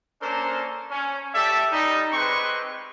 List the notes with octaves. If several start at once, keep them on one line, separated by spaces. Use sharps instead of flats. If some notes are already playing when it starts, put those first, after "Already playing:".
A#3 C#4 D4 A4 A#4 C5
C#4
G4 A4 D5 E5
G3 D#4
G#3 C4 G4 B4 C6 C#6